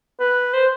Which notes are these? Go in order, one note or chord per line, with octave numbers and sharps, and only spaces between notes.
B4
C5